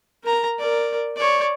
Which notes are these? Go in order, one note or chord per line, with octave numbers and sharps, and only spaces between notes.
A#4 A#5
A#4 D5
C#5 D5